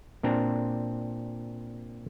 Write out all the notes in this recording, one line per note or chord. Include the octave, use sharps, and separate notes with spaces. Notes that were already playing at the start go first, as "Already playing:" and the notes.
A#2 C4 D4 A#5